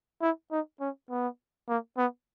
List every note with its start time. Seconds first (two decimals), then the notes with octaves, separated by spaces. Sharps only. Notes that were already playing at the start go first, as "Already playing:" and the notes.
0.22 E4
0.51 D#4
0.80 C#4
1.10 B3
1.69 A#3
1.97 B3